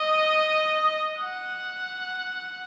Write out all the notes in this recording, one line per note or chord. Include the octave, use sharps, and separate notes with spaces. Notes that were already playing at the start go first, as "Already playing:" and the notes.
Already playing: D#5
F#5